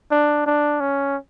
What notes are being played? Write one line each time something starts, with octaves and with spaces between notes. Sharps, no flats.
D4
D4
C#4